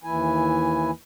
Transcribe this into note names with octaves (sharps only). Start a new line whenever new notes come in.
D#2 E3 E4 G#5